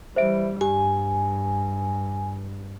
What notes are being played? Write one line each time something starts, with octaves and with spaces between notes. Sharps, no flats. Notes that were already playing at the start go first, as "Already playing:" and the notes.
E3 G3 C5 E5 D7
G2 G4 G#5